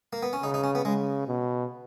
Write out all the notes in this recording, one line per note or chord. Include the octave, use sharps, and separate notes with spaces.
A#3
B3
C#4
C#3 D#4
D#4
C#4
B3
C#3 G#3
B2